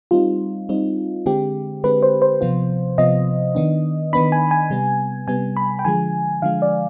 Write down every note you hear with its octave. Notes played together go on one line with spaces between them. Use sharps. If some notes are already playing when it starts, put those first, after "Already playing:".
G3 C4 D#4 F4
G3 C4 D#4
D3 G#3 C4 G4
D3 G#3 C4 B4
C5
C5
C3 F3 B3 F4
C3 F3 B3 F4 D#5
D#3 B3 D4
D#3 B3 D4 B5
G#5
G#5
C3 G3 B3
C3 G3 B3 G#5
B5
G5
D3 F3 G#3 G#5
D3 F3 G#3 F5
D5